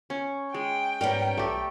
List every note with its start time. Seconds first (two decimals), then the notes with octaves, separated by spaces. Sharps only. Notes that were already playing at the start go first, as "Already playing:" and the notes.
0.10 C#4
0.54 G#3 G5
1.01 G#2 G3 B3 C#4 A#4
1.37 B1 A3 G4